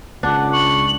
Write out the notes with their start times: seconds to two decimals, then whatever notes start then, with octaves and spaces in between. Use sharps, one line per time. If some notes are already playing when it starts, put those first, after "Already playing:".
0.23 C#2 D4 F#5
0.53 C#6 F#7